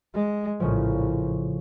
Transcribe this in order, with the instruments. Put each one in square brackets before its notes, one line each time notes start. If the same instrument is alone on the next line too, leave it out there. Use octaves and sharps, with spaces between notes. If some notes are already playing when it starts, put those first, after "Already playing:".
[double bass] G#3
[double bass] A#1 [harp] A2 C#3 F3